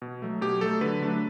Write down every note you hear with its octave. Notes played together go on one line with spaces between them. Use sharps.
B2
F#3 A3
B2 G4
F#3 A3 A4
D3 B4
F#3 A3 D4